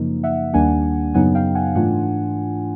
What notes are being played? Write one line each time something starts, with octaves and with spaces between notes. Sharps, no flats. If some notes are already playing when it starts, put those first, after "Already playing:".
Already playing: F#2 C#3 F3 A#3 D#4
E5 F#5
D#2 D#3 G3 A#3 D4 F#5 G#5
F#2 C#3 F#3 B3 D#4 F#5 G#5
F5 G5
F#5 G#5
G#2 E3 A3 D4 F4 F#5 G#5